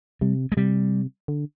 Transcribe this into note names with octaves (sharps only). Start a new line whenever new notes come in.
C3 G3
G#3
C3 G3
D3